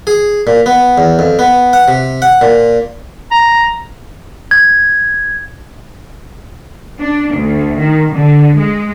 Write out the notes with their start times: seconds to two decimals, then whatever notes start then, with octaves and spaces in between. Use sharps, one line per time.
0.07 G#4
0.47 A#2
0.66 B3
0.98 E2
1.19 F2
1.39 B3
1.73 F#5
1.88 C3
2.22 F#5
2.41 A#2
3.31 A#5
4.51 G#6
7.00 D4
7.34 D2
7.78 D#3
8.13 D3
8.56 G#3